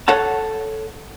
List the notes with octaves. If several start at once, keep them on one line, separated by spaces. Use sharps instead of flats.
A4 C#5 F#5 A5